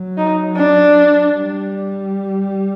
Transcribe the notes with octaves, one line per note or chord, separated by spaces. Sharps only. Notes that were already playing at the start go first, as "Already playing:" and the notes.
Already playing: F#3
D#4
D4
G3